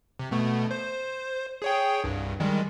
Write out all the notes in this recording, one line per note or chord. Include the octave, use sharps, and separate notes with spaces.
C3
B2 A3 B3
C5
G#4 C#5 G5
C2 G2
D#3 G3 G#3